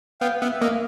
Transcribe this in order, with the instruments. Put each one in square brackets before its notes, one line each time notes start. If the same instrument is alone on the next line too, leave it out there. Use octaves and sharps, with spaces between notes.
[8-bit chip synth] B3 [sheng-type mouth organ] F5 G5
[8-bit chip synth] B3 [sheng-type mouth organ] E5 F#5
[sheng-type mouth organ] E5
[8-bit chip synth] A#3 [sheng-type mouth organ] D#5 F5